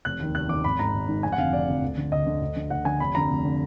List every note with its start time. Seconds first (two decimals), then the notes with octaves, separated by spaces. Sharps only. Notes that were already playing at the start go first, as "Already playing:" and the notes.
0.05 F1 F#6
0.20 D#2 D#3
0.35 F1 F#6
0.49 D#2 D#3 D6
0.64 G#1 B5
0.79 G#2 D#3 A#5
0.94 G#1
1.08 G#2 D#3
1.23 F1 G#5
1.32 F#5
1.38 F2 D3 F5
1.53 F1 D5
1.68 F2 D3
1.82 D2
1.98 D3
2.12 D2 D#5
2.27 D3
2.42 D2
2.56 D3
2.70 D2 F#5
2.85 D3 G#5
3.00 F1 B5
3.15 F2 D3 A#5
3.30 F1
3.45 D3